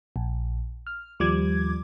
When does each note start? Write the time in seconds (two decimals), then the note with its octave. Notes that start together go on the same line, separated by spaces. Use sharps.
0.16 A#1
0.87 F6
1.20 D#2 F3 G3 D6 G#6